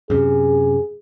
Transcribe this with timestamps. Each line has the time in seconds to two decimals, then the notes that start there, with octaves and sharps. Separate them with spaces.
0.10 F#2 C3 G#4